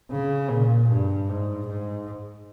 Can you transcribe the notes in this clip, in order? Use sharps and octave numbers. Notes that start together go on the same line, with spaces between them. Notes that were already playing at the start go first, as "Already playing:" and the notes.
C#3
A#2
G2
G#2
G#2